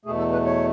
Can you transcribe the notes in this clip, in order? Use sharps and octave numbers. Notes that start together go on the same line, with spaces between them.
E2 B2 A3 G#4
A4
B4
C#5